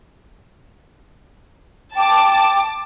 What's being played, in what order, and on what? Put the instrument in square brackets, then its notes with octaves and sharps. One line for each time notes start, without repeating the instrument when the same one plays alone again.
[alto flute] G5 [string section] A5 D6